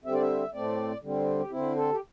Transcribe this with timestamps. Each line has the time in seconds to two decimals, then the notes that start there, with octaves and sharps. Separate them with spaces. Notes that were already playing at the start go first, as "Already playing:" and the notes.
0.04 D3 G3 C4 E5
0.13 D5
0.21 E5
0.53 A2 A3 C4 D5
1.02 D3 G3 C4
1.39 G4
1.51 D3 C4 E4
1.76 A4
1.92 G4